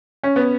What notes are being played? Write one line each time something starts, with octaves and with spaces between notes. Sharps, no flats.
C#4
B3